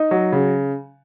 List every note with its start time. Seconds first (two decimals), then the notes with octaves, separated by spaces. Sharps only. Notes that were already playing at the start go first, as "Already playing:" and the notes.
Already playing: D#4
0.11 F#3
0.32 C#3